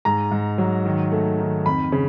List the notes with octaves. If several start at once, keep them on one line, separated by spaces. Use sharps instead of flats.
G#2 A#5
G#2
F#3
D#3
A3
D#3
F2 B5
C#3